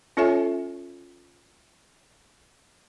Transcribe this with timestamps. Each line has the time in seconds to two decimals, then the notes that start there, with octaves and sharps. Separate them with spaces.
0.17 C#4 F4 A4 C#5 E5 G#5